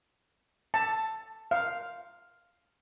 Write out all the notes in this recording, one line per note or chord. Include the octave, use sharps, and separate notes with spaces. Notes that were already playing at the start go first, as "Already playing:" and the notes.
A5
F5